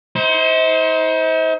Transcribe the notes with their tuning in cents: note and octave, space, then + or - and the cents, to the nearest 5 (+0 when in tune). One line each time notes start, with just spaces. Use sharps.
D#4 +45 C5 +0